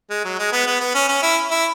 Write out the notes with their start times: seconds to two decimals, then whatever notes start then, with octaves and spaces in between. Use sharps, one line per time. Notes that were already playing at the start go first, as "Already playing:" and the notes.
0.10 G#3
0.25 F#3
0.39 G#3
0.52 B3
0.67 B3
0.80 B3
0.95 C#4
1.09 C#4
1.22 E4
1.51 E4